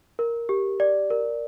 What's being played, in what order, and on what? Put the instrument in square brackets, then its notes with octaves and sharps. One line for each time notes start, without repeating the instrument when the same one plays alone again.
[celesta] A#4
G4
D5
A#4